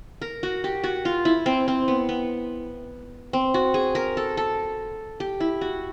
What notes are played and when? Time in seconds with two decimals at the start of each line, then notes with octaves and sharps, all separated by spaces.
0.22 A#4
0.43 F#4
0.64 G4
0.84 F#4
1.05 F4
1.25 E4
1.46 C4
1.68 C4
1.88 B3
2.09 B3
3.33 C4
3.54 F#4
3.74 G#4
3.95 A#4
4.17 A4
4.37 A4
5.20 G4
5.40 E4
5.61 F#4